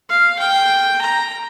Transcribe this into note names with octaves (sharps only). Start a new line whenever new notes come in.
F5
G5
A#5